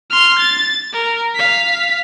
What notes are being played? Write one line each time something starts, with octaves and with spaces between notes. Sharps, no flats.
C6 F6
A6
A#4
F5 B6